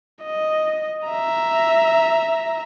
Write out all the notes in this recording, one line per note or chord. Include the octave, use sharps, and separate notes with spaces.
D#5
E5 A#5